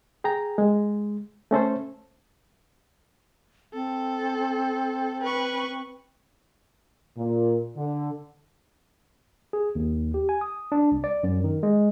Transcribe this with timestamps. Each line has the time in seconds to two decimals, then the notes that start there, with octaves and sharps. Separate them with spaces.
0.24 G#4 G5 A#5
0.58 G#3
1.51 A3 C#4 A4 C5
3.74 C4 A4
5.23 B4 C#6
7.16 A#2
7.76 D3
9.53 G#4
9.75 D#2
10.14 G4
10.29 G#5
10.41 D#6
10.72 D4
10.92 C2
11.04 D5
11.23 F#2
11.44 D#3
11.63 G#3